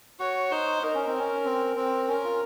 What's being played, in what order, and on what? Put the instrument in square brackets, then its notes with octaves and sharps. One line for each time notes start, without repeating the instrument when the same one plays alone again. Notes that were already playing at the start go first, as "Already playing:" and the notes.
[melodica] F#4 [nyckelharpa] C#5
[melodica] D#4 [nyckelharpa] C5
[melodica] D#4 [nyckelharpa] A#4
[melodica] C#4
C4
C#4
C4
C4
[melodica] C#4 [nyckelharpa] A#4
[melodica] F4